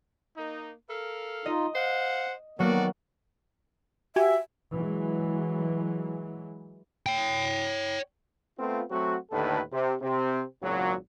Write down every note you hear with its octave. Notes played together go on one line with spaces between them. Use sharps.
A#3 D#4
A4 A#4 F5
D#4 F4 D#5
C5 F5 F#5
D#3 F#3 A#3 B3 F#4 A4 D5
F#4 G4 E5 G#5
E3 F#3 G#3
C#5 G5
A3 B3 C4 F4
F#3 A3 C4 F#4
D#2 A2 D3 D#3 A4 B4
C3
C3 C4
G#1 A#2 C#3 F#3